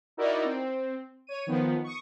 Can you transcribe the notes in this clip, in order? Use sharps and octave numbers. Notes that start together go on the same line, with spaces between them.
D#4 E4 F#4 A#4 D5 D#5
C4
C#5 D#7
D#3 F3 B3
C#6 D#6